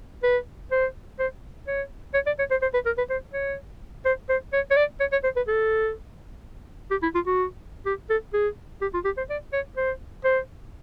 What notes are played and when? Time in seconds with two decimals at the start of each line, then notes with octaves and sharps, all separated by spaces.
0.23 B4
0.71 C5
1.19 C5
1.67 C#5
2.14 C#5
2.26 D5
2.39 C#5
2.51 C5
2.62 C5
2.74 B4
2.86 A#4
2.98 B4
3.10 C5
3.33 C#5
4.05 C5
4.29 C5
4.53 C#5
4.71 C#5
4.77 D5
5.00 C#5
5.12 C#5
5.24 C5
5.36 B4
5.48 A4
6.91 G4
7.03 E4
7.15 F4
7.26 F#4
7.86 G4
8.10 A4
8.34 G#4
8.81 G4
8.94 F4
9.05 G4
9.17 C5
9.30 D5
9.53 C#5
9.77 C5
10.24 C5